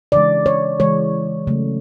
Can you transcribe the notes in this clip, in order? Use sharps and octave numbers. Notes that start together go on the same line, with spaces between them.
C#3 E3 G#3 D5
C#5
C#3 E3 G#3 C#5
C#3 F#3 A3